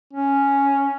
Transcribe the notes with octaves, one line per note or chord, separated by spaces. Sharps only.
C#4